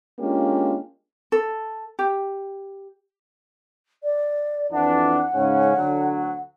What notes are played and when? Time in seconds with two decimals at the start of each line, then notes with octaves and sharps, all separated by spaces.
0.19 G#3 A#3 C#4 D4 F4 G4
1.32 A4
1.99 G4
4.03 D5
4.72 F2 E3 D4 F#5
5.35 G#2 C#3 C#4
5.76 D2 D3 F#3